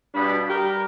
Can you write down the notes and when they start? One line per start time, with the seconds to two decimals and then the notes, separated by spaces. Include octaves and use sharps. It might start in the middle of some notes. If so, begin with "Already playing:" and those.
0.15 G2 B2 D4 B5
0.50 G3 G4 A#4